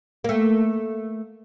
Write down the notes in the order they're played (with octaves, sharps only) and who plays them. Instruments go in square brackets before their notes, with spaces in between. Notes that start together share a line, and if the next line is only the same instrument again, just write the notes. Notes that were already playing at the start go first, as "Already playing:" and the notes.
[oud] A3 A#3